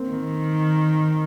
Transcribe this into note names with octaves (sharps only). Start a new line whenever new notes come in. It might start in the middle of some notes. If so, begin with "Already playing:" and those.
Already playing: A#3 C4
D#3